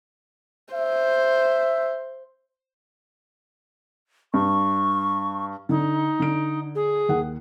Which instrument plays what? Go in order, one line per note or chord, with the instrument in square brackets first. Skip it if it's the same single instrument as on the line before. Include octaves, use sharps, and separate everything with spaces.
[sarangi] C5 [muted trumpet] E5
[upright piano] G2 [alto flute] C#6
[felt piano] D3 [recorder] D#4
[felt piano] D3 D7
[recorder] G#4
[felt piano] D#2 F#5